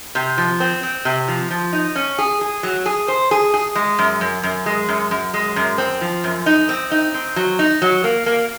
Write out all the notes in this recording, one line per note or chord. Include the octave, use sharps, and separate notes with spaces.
C3
F3
C4
C4
C3
F3
F3
D#4
C#4
G#4
G#4
F#3
G#4
C5
G#4
G#4
G#3
F#2
F#2
F#2
G#3
F#2
F#2
G#3
F#2
C4
F3
F#2
D#4
C4
D#4
C4
F#3
D#4
F#3
A#3
A#3